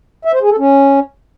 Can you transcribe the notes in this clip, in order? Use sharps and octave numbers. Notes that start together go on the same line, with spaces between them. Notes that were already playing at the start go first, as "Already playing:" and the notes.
E5
C5
G#4
A4
C#4